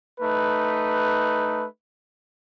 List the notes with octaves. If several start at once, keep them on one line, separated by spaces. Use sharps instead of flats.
A3 D#4 B4